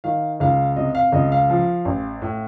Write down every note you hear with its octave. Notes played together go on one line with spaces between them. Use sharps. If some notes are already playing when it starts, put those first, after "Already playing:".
D#3 F5
C#2 F5
C3 D#5
F5
C#2 D#5
F5
F3
A1
A2